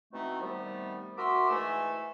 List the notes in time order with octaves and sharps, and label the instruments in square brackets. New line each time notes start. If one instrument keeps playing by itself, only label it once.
[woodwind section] B2 E3 A3 C4 D#4
C3 D#3 G3 A3 B3
F#4 A#4 E5 C6 D6
G#2 E3 A3 G#5 E6